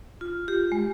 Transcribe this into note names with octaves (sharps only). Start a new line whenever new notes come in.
F4
G4
G#3